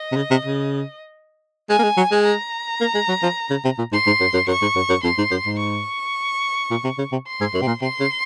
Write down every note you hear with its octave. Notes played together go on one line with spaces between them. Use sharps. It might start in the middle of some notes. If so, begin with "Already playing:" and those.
Already playing: D#5
C3
C#3
C3
C#3
G#3 G#5
A#3
G#3
F#3
G#3
A#5
A#3
G#3
F#3
F3
C#3
C3
A#2
G#2 C6
G#2
F#2
F#2
F#2 C#6
G#2
F#2
F#2
F2 C6
G#2
F#2
G#2
C#6
A#2
C3
C#3
C3
C6
G#2
F#2
C3
A#2
C3 C6
C#3